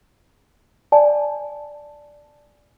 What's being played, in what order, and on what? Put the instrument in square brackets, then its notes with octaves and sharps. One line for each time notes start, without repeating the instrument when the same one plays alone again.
[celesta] D5 G#5 A5